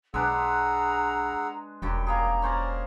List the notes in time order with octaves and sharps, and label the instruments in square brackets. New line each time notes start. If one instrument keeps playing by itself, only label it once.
[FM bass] B1 [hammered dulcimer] G#3 D4 B4 [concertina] G#4 F#5 E6 [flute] A#5
[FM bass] E1 [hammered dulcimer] F#2 G3 [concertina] G5
[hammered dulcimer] G3 A#3 G#4 [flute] A#5
[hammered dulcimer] C#4 C5 D5 [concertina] A#4